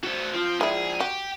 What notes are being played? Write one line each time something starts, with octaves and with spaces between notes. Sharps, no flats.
B3 F#4 A4 C5
F3 C4 F4
F3 G#3 E4 G#4 D5
F#4 G4 G5